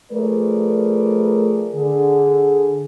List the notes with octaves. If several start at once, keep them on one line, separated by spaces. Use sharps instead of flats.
F3 A3 G#4 A#4 B4 D5
D3 G#4